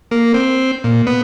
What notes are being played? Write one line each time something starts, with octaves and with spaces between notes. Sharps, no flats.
A#3
C4
A#2
B3